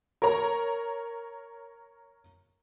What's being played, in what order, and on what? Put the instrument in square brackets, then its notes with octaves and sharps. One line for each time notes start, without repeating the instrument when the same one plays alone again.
[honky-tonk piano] A#4 C#5 A#5